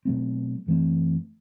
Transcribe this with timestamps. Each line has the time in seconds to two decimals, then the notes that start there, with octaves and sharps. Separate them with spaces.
0.05 B2 F#3 A3 C4
0.67 F#2 E3 A3 C4